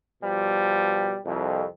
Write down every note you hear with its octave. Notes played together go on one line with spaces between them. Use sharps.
B2 F3 G3
C2 F2